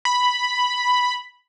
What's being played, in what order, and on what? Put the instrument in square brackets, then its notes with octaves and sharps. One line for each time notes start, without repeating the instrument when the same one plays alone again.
[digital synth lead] B5